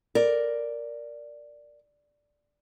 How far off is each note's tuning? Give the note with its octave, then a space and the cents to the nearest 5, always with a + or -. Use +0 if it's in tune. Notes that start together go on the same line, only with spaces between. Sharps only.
A#4 +0 D5 +0